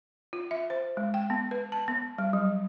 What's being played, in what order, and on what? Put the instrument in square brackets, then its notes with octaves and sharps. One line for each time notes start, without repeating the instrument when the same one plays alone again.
[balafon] F4
E5
C5
G#3
G5
B3
B4
A5
B3
G3
F#3